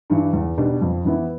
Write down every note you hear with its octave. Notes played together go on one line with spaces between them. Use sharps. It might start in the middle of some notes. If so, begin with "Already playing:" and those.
G2 E3
E2
B2 G3 D4
F2
E3 B3 E4